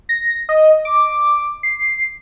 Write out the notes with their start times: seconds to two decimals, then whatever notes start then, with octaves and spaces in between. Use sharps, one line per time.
0.09 A#6
0.49 D#5
0.85 D6
1.63 C7